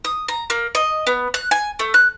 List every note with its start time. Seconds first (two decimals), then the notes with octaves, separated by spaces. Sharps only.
0.05 D#6
0.28 A#5
0.50 A#3
0.75 D#5
1.07 B3
1.34 F#6
1.51 G#5
1.79 A3
1.94 F#6